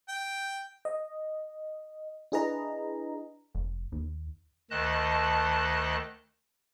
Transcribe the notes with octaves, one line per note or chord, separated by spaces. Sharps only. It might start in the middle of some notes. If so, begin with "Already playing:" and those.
G5
D#5
D4 E4 G#4 B4 D#5 A#5
F1
D#2
D2 D#3 D#5 A5 F#6